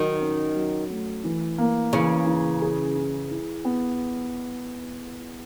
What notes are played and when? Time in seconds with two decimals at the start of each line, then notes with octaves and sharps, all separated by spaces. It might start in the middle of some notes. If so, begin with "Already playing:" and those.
Already playing: D#3 F#3
0.21 C#4
0.56 F#3
0.90 A3
1.24 E3
1.58 A#3
1.93 C#3 E3
2.27 E3
2.62 G#4
2.96 E4
3.31 E4
3.65 B3